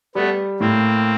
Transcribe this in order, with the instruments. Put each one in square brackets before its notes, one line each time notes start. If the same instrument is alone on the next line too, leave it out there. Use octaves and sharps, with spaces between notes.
[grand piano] G3 [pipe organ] A3 B3
[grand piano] A2 [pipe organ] A#3 C4